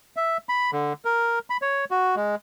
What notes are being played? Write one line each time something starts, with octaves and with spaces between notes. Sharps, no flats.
E5
B5
D3
A#4
B5
C#5
F#4
G#3